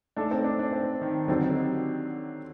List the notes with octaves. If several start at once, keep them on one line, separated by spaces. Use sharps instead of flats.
A3 D4 D#4 A4
C4
D4
D4
C4
D#3
D3 F#3 C4 D#4 G4